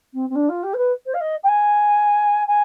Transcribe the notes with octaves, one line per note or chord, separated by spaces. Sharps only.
C4
C4
D4
F4
G4
C5
B4
C5
F5
D#5
G5
G#5
G#5